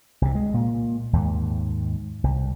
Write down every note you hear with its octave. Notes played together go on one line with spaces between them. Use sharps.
C2 C3
G#3
A#2
D#2 G#2
C2